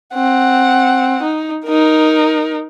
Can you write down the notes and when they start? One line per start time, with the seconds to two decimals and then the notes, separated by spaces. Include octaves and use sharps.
0.14 C4 F#5
1.22 D#4
1.65 D#4 A#4